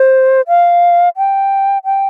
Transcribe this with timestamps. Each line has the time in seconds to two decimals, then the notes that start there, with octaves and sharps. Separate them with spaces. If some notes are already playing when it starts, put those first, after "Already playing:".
Already playing: C5
0.48 F5
1.17 G5
1.85 G5